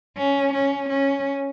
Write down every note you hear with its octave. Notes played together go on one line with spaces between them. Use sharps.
C#4
C#4
C#4